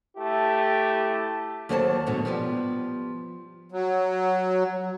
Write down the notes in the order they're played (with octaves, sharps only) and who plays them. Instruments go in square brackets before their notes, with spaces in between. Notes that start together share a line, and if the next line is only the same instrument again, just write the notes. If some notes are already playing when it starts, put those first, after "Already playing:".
[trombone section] A3 E4 G4
[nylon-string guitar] D#2 F#3 A4 C5 D#5 A5
G#2 B2 D3 F#4
F3 G3 B3 G4
[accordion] F#3